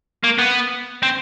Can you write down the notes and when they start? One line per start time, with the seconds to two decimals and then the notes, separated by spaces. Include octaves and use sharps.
0.24 A#3
0.38 B3
1.03 C4